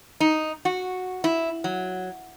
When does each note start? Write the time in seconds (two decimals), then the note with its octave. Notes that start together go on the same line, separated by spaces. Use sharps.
0.20 D#4
0.65 F#4
1.24 E4
1.64 F#3